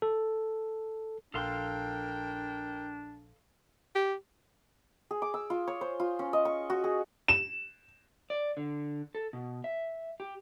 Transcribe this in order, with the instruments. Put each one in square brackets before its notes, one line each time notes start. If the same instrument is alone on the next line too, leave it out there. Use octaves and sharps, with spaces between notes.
[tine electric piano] A4
[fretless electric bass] A#1 [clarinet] D4 [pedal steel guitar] A4 F5 C6 [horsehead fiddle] A#4 G5
[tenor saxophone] G4
[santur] G#4
D6
E6
F4
C#5
C5
F4
C#4
D#5
C#6
F#4
G#4
[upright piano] E7
[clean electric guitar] D5
D3
A4
B2
E5
G4